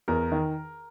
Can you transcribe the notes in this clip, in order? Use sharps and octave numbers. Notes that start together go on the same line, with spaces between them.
E2 A#4
D#3